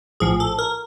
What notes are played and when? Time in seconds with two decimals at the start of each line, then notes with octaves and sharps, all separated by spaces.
0.20 A#1 A2 F3 G#4
0.40 A4
0.59 A#4